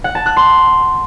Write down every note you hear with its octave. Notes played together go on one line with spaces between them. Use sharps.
F#5
A5
F#6
C6